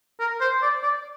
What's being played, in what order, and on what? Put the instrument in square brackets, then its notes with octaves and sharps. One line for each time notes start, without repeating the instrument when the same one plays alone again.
[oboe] A#4
C5
D5
D5